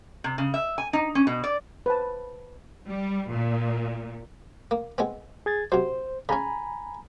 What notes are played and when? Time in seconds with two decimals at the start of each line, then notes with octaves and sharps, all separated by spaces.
0.24 C3
0.38 C#3
0.54 E5
0.78 G#5
0.93 D#4
1.15 C#4
1.27 B2
1.44 D5
1.86 B4 C5 A5
2.88 G3
3.33 A#2
4.71 A#3
4.98 G#3 B3 C4
5.46 G#4 G#6 A6
5.72 C3 F#3 C5
6.29 C#3 C#4 G#5 A#5 B5